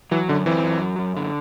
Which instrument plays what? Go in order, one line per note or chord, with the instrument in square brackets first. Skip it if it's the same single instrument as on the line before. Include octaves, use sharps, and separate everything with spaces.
[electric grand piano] E3 [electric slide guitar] F#3
[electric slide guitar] F#2 [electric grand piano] D3
[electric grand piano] E3 [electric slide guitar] C4
[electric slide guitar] F#2
F#3
F#2
D3